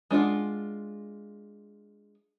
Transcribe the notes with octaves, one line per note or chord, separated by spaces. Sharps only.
G#3 D4 F4 F#5